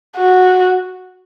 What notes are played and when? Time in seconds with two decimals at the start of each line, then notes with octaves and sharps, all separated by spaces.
0.16 F#4